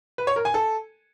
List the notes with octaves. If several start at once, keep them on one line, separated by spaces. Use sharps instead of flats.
B4
C#5
A#4
G#5
A4